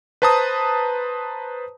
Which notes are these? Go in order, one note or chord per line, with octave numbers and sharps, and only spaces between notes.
B4 C5 A5 A#5 D#6